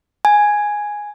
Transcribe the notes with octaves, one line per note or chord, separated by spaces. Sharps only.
G#5